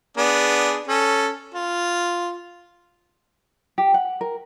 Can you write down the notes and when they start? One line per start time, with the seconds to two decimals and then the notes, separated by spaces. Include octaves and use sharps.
0.17 B3 D4 G#4
0.88 C#4 A4
1.54 F4
3.78 G4
3.94 F#5
4.21 A#4